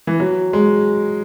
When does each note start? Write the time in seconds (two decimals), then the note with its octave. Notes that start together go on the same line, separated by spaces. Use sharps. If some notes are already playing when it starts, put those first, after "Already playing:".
0.07 E3
0.20 F#3
0.53 G#3